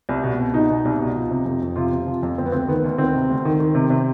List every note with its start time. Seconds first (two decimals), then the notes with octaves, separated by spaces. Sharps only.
0.09 C2
0.23 B2
0.39 C2
0.53 B2 D#4
0.70 B2
0.85 C2
1.00 B2
1.16 F3
1.31 C3
1.45 F2
1.62 F2
1.76 C3 F4
1.92 C3
2.06 F3
2.23 F2
2.38 D2 C4
2.46 B3
2.52 D2 C4
2.68 D#3 B3
2.84 D2
2.98 D#3 C4
3.14 C3
3.30 D2
3.45 D#3
3.60 D#3
3.75 C3
3.90 C3